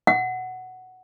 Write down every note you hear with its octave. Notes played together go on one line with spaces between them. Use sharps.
F#5